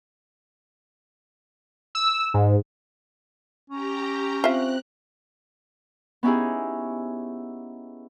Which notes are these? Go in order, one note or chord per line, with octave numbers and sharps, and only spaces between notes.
E6
G#2
C#4 G4 A#5
C4 F4 E5 F#6
B3 C#4 D#4 E4 G4 G#4